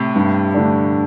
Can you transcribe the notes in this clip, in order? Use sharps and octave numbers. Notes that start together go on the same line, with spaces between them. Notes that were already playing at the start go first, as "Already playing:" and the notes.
Already playing: A2 C3
G2
D3 A3 D4